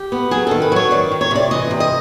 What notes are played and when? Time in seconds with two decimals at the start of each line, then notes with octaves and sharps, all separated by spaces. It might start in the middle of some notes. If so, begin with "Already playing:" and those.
Already playing: G4
0.12 B3
0.31 F#3 G#4
0.47 D#3 A4
0.62 B4
0.72 F#3 C#5
0.91 D#3 D5
1.11 D#3
1.21 C#5
1.31 C3 D5
1.51 E3 D#5
1.71 C3
1.80 D#5